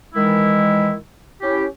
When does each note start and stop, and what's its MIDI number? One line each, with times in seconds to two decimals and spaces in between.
0.15 0.93 51
0.15 0.93 52
0.15 0.93 56
0.15 0.93 64
1.41 1.65 61
1.41 1.65 64
1.41 1.65 67